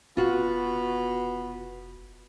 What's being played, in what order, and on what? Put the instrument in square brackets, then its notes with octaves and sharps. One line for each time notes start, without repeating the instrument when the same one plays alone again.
[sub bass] F1 [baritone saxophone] B2 [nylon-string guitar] F4 F#4